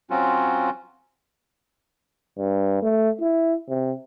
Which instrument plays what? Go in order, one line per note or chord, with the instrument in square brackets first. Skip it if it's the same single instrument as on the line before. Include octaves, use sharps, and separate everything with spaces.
[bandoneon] F#3 C4 C#4 F4 F#4
[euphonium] G2
A3
E4
C3